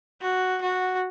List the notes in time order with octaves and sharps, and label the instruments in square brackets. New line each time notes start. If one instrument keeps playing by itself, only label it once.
[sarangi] F#4
F#4